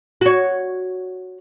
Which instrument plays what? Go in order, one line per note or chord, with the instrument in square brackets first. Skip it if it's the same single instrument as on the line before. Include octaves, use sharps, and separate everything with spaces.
[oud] F#4 C#5